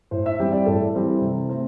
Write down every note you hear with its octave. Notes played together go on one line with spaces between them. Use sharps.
A2 C5
E5
E3 G3 C4 G5
D5
A2 A4
E3 G3 C4
C3
A3 C4